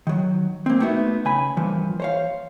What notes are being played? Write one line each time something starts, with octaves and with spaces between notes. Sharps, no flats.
D#3 F#3
A#3 C4
A3 B3 D#4 F#4 E5
C#3 G#5 B5
G2 A#2 E3 F3
C5 C#5 F5